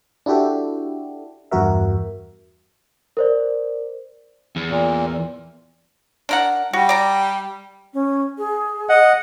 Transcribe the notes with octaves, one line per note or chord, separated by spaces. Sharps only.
D4 E4 F#4 G4 A4
E2 G2 F#4 A#4 E5
A#4 C5 D5
E2
A#2
D4 A#4 F#5
G3 F#4
D5 A#5
C#4
G#4
D#5 F#5